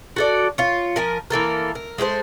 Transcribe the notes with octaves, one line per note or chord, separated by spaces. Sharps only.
F#4 A4 D5
F4 C#5
F3 A#4 G#5
E3 A#3 A4 A#4
A#4
G#3 A3 G4 C5